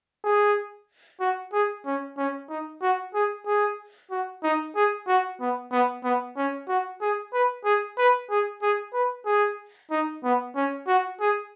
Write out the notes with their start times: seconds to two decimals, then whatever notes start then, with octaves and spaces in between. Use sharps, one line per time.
0.24 G#4
1.20 F#4
1.53 G#4
1.86 C#4
2.18 C#4
2.49 D#4
2.82 F#4
3.15 G#4
3.46 G#4
4.11 F#4
4.44 D#4
4.76 G#4
5.08 F#4
5.41 B3
5.72 B3
6.04 B3
6.37 C#4
6.69 F#4
7.02 G#4
7.33 B4
7.65 G#4
7.98 B4
8.30 G#4
8.62 G#4
8.94 B4
9.26 G#4
9.91 D#4
10.24 B3
10.56 C#4
10.88 F#4
11.21 G#4